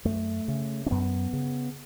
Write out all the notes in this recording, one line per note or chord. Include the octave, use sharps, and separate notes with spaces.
F#2 A3
C#3
C#4
F#2 B3
C#3